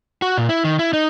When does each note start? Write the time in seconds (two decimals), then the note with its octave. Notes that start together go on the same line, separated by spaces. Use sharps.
0.22 F#4
0.37 A#2
0.49 E4
0.64 D#3
0.79 E4
0.93 D#4